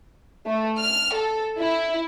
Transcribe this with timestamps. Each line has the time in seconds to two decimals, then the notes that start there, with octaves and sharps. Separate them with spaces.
0.47 A3
0.79 F6
1.15 A4
1.59 E4